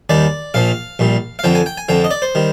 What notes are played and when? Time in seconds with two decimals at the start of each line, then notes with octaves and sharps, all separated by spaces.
0.09 D#2 D#3 G3 D5
0.54 A#1 A#2 F3 F5
0.99 A#1 A#2 G3
1.39 F5
1.44 F2 D3 F3 G5
1.55 G#5
1.66 G5
1.78 G#5
1.89 F2 D3 F3 G5
2.04 D#5
2.11 D5
2.22 C5
2.35 D#3 G3